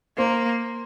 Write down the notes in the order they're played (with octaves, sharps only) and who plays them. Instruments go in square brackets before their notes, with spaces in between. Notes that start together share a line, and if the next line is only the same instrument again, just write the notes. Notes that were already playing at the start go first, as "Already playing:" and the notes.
[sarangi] A#3 [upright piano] C5